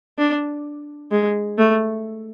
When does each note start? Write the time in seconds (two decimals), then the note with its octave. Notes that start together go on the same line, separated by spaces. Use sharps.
0.18 D4
1.11 G#3
1.58 A3